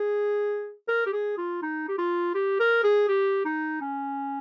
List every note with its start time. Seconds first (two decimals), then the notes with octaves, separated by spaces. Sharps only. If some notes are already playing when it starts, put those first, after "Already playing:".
Already playing: G#4
0.88 A#4
1.06 G4
1.13 G#4
1.37 F4
1.62 D#4
1.88 G4
1.98 F4
2.34 G4
2.60 A#4
2.84 G#4
3.08 G4
3.45 D#4
3.81 C#4